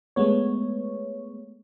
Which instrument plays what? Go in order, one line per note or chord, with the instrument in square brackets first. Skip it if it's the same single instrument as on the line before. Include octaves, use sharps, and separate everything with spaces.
[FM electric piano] G#3 A3 B3 C#5